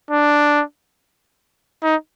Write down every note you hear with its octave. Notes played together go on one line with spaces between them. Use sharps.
D4
D#4